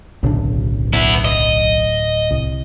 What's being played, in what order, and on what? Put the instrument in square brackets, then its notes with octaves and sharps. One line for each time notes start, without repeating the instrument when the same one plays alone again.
[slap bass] D1 [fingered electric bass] B1 C#3 D4
[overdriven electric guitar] B3 E4
D#5
[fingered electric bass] C2